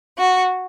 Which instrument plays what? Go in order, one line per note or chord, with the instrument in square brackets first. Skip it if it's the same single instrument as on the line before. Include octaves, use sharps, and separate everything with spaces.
[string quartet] F#4